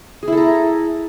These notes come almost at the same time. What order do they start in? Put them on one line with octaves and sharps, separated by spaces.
G#4 E4 A4 A#5